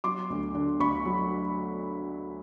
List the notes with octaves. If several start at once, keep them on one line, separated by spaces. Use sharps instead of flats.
F#3 C6 D6
D2
D3
D2 B5 C#6
F#3